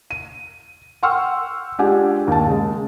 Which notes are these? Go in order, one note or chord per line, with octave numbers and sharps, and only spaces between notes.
D#7
F#5 G5 C6 C#6 E6 F6
G#3 D4 F4 G4 F#5 G#5
D#2 A5
C#3 G#3